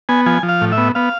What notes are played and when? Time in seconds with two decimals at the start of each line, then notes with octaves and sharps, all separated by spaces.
0.09 B3 G#5
0.26 F3 G#5
0.43 F3
0.49 F5
0.61 A2
0.72 E5
0.78 B3
0.95 B3 F5